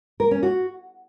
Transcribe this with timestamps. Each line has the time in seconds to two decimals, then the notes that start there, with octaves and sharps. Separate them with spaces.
0.20 A#4
0.31 C#4
0.43 F#4